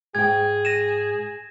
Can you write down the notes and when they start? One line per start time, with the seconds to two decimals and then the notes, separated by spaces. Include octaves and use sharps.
0.15 G#2 G#4 G5 G#6
0.65 A#6 D#7 E7